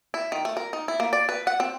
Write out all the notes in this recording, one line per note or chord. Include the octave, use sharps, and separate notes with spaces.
E4
D#3
A3
A#4
D#4
E4
A#3
D5
B4
F#5
C4